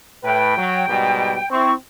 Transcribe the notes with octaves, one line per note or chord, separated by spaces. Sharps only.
A2 B4 G5
F#3
G#2 B2 G3
C4 E4 C#6